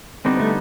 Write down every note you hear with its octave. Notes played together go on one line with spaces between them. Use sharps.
D3 G3 B3 C4 D#4
A3